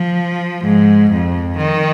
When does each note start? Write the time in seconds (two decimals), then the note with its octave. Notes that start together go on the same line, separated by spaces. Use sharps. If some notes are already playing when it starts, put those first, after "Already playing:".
Already playing: F3
0.65 G#2
1.11 F2
1.57 D#3